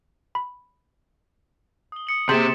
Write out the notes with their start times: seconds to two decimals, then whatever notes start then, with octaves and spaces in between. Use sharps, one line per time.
0.35 B5
1.92 D#6 G7
2.07 D#6 C#7 F#7
2.29 C3 A#3 G#4 C6 G6 A6 B6 E7